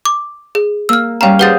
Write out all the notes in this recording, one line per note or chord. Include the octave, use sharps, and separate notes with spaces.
D6
G#4
A#3 E6 F6
G3 C#4 F5 G5 A#5
G4 G#4 B4 C5 F#5 A6